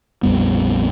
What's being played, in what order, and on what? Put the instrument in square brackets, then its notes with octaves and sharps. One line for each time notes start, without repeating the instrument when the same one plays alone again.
[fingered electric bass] A#1 F2 G3 B3